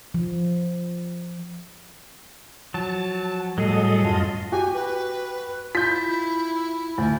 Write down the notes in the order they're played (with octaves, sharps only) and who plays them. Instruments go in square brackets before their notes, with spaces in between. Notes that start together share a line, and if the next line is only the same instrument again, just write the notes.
[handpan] F3
[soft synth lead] F3 [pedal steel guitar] F#3 [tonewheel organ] A5
[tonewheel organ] A2 A4 D#5 [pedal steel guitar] F#3 G#4 [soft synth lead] G3
[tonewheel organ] F#2 F4 D#5 [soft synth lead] A5
[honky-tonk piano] F#4 G4 [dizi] G#5
[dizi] B4
[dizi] E4 [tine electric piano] F4 [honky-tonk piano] G6 B6
[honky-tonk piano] D2